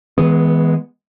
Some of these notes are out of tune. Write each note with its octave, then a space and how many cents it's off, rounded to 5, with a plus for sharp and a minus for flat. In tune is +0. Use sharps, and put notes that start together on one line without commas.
E3 -40 G#3 +0 B3 +0